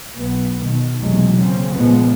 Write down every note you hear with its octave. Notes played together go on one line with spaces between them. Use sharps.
B1 B3
B2 D#3
B1 E2 C3 F#3 G#3 A3
C#3 A#3 C4 C#4
A#2 C#3 F3 G#3 B3